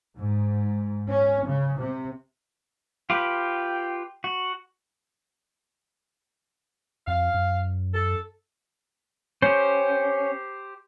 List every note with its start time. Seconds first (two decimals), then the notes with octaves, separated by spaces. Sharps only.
0.17 G#2
1.10 C#4
1.46 C#3
1.79 C3
3.10 F4 G4 B4 G5
4.24 F#4
7.07 F2 F5
7.34 F#2
7.94 A4
9.42 C#4 G4 C5